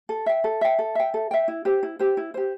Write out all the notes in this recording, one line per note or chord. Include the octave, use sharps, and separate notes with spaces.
A4
E5 G5
A4
E5 G5
A4
E5 G5
A4
E5 G5
E4
G4 C5
E4
G4 C5
E4
G4 C5